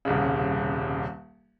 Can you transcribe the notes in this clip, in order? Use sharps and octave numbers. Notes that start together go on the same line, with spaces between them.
D#1 C2 C#3